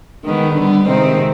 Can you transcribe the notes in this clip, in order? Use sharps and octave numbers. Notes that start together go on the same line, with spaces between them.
D#3 G#3 B3
D3 G3 B3
C3 D#3 G#3 C4 D#4